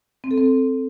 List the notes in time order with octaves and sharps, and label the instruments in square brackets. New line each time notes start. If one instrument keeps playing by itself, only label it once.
[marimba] C4
A4
C4